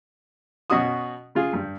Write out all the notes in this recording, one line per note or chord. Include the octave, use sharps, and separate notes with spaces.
B2 C#4 F#4 C#6 D#6
C#3 F4 G#4
G2 G3